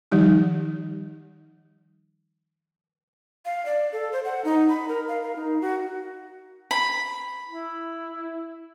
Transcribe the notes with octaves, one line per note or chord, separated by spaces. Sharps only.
D#3 F3 G3 D#4 G4
F5
D5
A4
C5
F#5
D#4
B5
A#4
F5
A#4
D#4
F#4
B5
E4